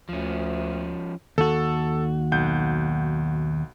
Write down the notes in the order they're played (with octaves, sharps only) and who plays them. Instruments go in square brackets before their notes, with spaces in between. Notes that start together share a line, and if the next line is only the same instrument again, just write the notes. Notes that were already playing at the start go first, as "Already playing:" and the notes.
[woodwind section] D2 [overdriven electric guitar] F3 C#4
[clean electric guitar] D#2 F#4 [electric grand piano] A4
[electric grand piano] B1 F#5 G6